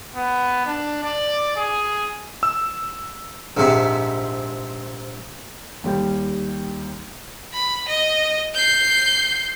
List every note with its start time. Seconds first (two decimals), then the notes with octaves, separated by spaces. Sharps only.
0.15 B3
0.66 D4
1.04 D5
1.56 G#4
2.43 E6
3.57 A#1 G#2 C3
5.84 D#2 G3 G4
7.53 B5
7.88 D#5
8.54 G6 C7